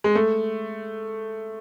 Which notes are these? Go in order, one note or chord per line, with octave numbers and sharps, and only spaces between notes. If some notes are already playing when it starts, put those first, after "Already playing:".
G#3
A3